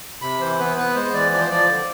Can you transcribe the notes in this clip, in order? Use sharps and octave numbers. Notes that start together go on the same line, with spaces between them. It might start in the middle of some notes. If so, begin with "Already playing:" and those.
C3 B5
E3 C5
B3 B4
B3 B4
G#3 C5
E3 D5
F3 D5
C5
F3 D5
D3